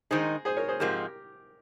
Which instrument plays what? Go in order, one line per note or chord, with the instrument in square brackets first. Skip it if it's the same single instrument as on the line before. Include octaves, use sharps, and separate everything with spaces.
[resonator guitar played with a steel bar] D#3 G#3 D#4 [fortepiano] G#4 C5
[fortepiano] G#4 C5
A#4 C#5
G#4 C5
[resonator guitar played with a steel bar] G#2 F3 G#3 C4 [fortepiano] G4 A#4